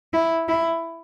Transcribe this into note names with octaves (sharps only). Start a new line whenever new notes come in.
E4
E4